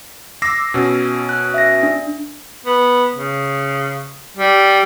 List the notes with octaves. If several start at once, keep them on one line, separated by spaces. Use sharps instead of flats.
D6 E6 A#6 C7
B2 C#4
F#6
E5 A#6
D4
B3
C#3
G3